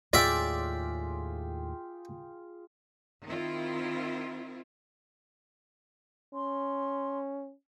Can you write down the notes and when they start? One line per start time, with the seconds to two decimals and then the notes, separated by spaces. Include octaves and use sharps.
0.13 D#2 A2 F4 G#4 D5 E5 G5
3.27 D#3 C4 E4 F4
6.34 C#4 C6